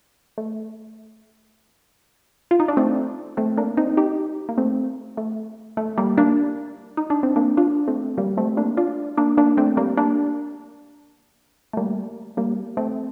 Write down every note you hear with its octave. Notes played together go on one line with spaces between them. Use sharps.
A3
F4
D#4
D4
A3 C4
A3 C4
A#3 D4
C4 D#4
D#4 G4
A#3
A3 C4
A3
A3
G3 A#3
A#3 D4
D#4
D4
C4
A#3 D4
D4 F4
A3 C4
G3 A#3
A3 C4
A#3 D4
D4 F4
A#3 D4
A#3 D4
A3 C4
G3 A#3
A#3 D4
A3
G3 A#3
G3 A#3
A3 C4